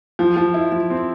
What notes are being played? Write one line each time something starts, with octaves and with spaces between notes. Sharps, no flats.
F3
F3
E4
F3
C4